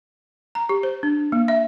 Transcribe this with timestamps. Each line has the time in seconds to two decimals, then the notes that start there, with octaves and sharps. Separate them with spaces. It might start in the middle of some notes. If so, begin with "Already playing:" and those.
0.55 A#5
0.69 G4
0.83 C5
1.03 D4
1.32 A#3
1.48 E5